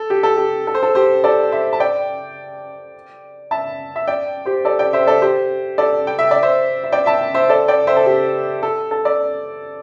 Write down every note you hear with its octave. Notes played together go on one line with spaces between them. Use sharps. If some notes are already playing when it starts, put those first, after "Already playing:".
Already playing: A4
G4
A4
G4
A4
C5
A4
G4 C5
A4 D5
C5 E5
A5
D5 G5
E5 A5
E5
D5 G5
G4 C5
A4 D5
D5 G5
C5 E5
A4 D5
G4 C5
A4 D5
G5
E5
D5
C5 E5
E5
D5 G5
E5 A5
C5 E5
A4 D5
D5 G5
C5 E5
A4
G4
A4
A4
A4 D5